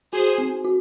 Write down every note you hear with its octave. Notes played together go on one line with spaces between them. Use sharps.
F#4 G#4 C5
C4
F#4